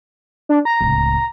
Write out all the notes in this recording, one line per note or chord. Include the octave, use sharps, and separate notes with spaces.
D4
A#5
D1 C#2